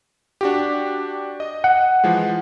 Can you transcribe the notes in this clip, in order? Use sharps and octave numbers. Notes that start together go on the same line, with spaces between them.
D4 F#4 G4
D#5
F#5
E3 F3 G#3